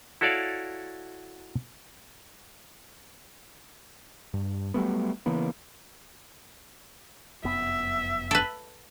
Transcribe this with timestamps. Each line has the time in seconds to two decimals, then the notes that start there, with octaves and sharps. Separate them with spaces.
0.21 E4 F#4 A4 C#5 D5 F5
4.34 G2
4.74 F#3 G3 A3 B3
5.26 C#3 E3 A#3 B3
7.44 F1 F#2 B3 E5
8.31 A4 B4